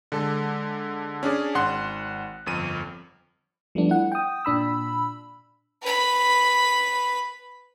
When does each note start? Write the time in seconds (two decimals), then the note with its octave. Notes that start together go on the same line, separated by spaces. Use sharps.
0.12 D3 G#3 A4
1.23 C#4 D4 G#4 D5
1.55 G#1 F#5 C6 F#6
2.46 G1 F2 D#7
3.75 F3 G3 A3 B3 D4
3.89 E4 F#5
4.12 G5 D#6
4.45 A#2 D4 B5 E6
5.82 B4 B5